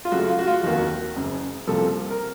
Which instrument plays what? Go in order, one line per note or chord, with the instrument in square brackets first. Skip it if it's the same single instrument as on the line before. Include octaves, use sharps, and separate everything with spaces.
[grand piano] F4
F#2 C#3 A3 F#4
F4
F#4
F4
F1 D#2 D#3 A#3 F#4
F#1 F#2 C#3
C2 C3 F3 A#3 A4
A#4